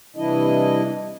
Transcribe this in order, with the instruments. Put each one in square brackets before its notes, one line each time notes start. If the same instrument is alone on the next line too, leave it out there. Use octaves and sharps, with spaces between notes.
[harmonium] C3 E3 G3 D4 E4 D#5